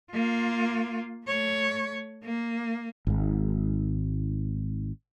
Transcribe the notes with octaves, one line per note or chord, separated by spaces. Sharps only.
A#3 F4
A3 C#5
A#3
G#1 G#2